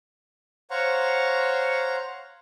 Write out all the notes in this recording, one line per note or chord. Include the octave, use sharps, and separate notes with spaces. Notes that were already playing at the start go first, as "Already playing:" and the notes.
C5 C#5 F5 F#5 A#5 C#6